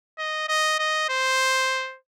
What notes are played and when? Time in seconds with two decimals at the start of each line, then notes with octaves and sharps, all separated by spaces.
0.18 D#5
0.49 D#5
0.79 D#5
1.09 C5